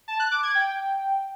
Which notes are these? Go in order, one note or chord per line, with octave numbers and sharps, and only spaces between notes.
A5
F#6
D6
G#6
G5